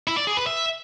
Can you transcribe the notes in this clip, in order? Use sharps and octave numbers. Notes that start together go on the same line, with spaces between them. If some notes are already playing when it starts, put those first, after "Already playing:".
E4
D5
G#4
B4
E5